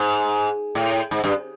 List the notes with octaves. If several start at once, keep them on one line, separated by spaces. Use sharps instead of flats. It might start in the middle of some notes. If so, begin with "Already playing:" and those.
Already playing: G#2
A2
G#2
G2